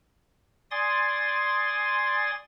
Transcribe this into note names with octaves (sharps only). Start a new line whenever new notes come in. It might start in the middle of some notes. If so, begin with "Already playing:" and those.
D5 G#5 C6 D#6 A6